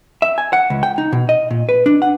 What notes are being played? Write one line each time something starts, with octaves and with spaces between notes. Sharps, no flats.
E5
G#5
F#5
C#2
G5
D#4
B2
D#5
A#2
B4
D4
F#5